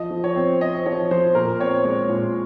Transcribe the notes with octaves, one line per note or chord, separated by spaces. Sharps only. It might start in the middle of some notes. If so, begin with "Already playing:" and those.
Already playing: F3 D#5
F3
C#5
C4
C4 D#5
F3 C#5
F3 C5
A#2 A#4
C4 C#5
G#3 C#5
A#2